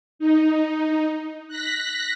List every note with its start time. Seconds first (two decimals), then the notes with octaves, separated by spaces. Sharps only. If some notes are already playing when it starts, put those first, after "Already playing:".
0.19 D#4
1.48 F#6 A#6 B6